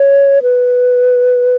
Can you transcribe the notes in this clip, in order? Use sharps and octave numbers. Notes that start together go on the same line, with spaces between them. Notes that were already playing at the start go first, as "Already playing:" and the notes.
Already playing: C#5
B4